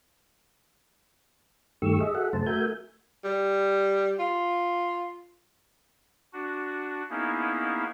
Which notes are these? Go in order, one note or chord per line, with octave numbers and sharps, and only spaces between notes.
G2 D#3 A3 G4 C#6 E6
G#4 D#5 E5
F#4 G#4 A4 E5 F#5
F#2 C#3 A3 C5 A5
A3 F#4 A#4 E5 G#5 G6
G3
F4
D4 F#4
A#3 B3 C#4 D#4 E4 G#4